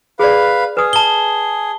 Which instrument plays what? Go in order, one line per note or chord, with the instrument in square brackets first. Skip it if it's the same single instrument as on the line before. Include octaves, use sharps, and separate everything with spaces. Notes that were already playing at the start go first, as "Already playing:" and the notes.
[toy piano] G#4 D5 [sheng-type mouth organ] B4 F5
[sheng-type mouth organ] G#4 [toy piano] B4 D#6
[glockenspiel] A5 G7